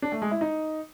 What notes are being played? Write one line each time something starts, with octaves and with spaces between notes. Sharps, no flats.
D4
A3
G#3
E4
D#4